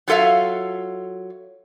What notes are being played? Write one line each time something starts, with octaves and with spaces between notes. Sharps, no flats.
F#3 F4 A4 E5 F5